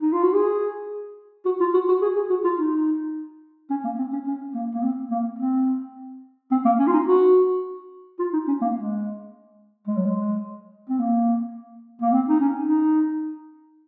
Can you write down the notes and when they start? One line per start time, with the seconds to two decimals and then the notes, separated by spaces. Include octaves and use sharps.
0.02 D#4
0.12 F4
0.23 F#4
0.34 G#4
1.45 F#4
1.60 F4
1.74 F#4
1.88 F#4
2.02 G#4
2.16 G#4
2.30 F#4
2.44 F4
2.58 D#4
3.70 C#4
3.84 A#3
3.98 C4
4.12 C#4
4.26 C#4
4.54 A#3
4.74 A#3
4.83 C4
5.11 A#3
5.38 C4
6.51 C4
6.65 A#3
6.79 C#4
6.87 F4
6.93 D#4
7.07 F#4
8.19 F4
8.33 D#4
8.47 C#4
8.61 A#3
8.75 G#3
9.87 G#3
9.96 F#3
10.05 G#3
10.89 C4
10.99 A#3
12.01 A#3
12.12 C4
12.28 D#4
12.40 C#4
12.68 D#4